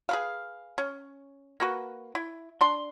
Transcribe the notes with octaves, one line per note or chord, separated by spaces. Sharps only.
G#4 B4 F5
C#4
A#3 F#4 B4
E4
D4 C6